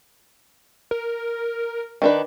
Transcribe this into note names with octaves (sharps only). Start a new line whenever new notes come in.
A#4
D#3 D4 B4